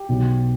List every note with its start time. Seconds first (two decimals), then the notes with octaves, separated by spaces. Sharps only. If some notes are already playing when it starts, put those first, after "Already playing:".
Already playing: G4
0.09 B1 B2